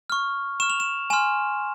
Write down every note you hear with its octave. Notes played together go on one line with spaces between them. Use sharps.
C#6 F6
C#6 F6 E7
F7
E7
G#5 C6 F6 E7